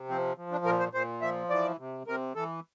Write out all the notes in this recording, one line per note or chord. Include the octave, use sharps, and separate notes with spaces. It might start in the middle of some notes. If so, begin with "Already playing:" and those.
Already playing: C3
F3 C4
F3
D4
A#2 A#4
C5
A#2 C5
F3 E5
E3 D5
C3
C3 A#4
E3 A4